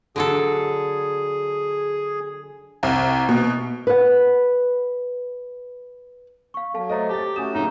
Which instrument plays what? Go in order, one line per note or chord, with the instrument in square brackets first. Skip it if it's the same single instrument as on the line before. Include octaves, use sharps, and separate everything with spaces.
[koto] D3 F#3 A4 [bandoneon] G#4
[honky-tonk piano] C2
B2
[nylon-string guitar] B4 F#5
[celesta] F5 C#6
[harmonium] F#3 [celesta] A4 F5 A5
[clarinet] A3 [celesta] A4 C5 A#5 [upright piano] D#5
[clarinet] G4 [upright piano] A5 A6
[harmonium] A3 C#4 F#4 [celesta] G#5 G6 E7 [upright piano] D#6
[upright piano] F#1 A2 C#3 [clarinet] D#4